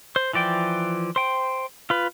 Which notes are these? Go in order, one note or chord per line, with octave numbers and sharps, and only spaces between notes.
C5
E3 F3 D5 G5
C5 G5
F4 B4